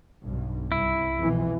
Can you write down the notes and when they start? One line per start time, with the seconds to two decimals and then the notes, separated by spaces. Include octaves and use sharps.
0.24 B1 G2
0.72 C2 E4
1.18 F2 B2 E3